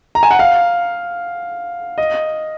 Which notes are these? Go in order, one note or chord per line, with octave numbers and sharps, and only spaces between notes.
A#5
G#5
F#5
F5
D#5